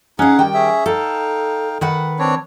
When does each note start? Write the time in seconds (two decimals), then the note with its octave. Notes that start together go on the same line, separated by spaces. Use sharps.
0.19 C#4 D#4 G#4 F5 F#5
0.39 D#3 G3 G5
0.54 C#4 G#4 E5
0.86 D#4 A4 F5 G5
1.81 D#3 B4 F#5
2.19 C4 D4 C#5